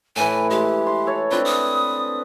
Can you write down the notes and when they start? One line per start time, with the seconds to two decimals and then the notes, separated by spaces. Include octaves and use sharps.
0.16 A2 E3 G#5
0.50 G#3 G4
0.87 C6
1.07 A4 C#5
1.31 C4 D4 F4 B4
1.45 D#6